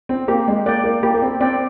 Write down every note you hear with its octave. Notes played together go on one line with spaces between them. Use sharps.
C4
A#3 G4
G#3
A#3 D5 G5
A#3
A#3 G4
A#3
C4
C4 D5 G5